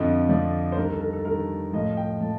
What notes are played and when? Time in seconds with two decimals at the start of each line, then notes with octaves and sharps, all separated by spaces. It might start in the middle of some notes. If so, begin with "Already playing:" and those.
Already playing: F2 D3 F3 D#5
0.29 F2 D3 F3 D5
0.72 C5
0.77 G2 D#3 A#4
0.90 A4
1.01 A#4
1.13 A4
1.25 G2 D#3 A#4
1.73 A2 F3 D#5
1.97 G5
2.21 A2 F3 A5